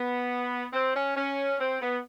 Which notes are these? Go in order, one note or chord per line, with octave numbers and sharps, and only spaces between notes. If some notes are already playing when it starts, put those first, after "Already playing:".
Already playing: B3
C4
C#4
C#4
C4
B3